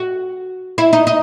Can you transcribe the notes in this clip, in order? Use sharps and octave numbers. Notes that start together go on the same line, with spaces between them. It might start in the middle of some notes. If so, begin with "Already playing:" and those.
Already playing: F#4
E4
D#4
D#4